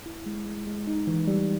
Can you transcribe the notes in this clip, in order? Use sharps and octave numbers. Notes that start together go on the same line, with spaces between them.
E4
G#3
G#3
G#3
D#4
E3
G3